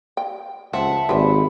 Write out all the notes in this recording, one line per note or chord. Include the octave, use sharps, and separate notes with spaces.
G5
C#2 F3 C4 E5 F#5 A5
G#1 G3 C4 E4 G4 B4